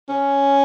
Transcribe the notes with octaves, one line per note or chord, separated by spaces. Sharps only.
C#4